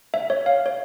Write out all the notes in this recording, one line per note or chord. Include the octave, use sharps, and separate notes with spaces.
E5
C#5
F5
C#5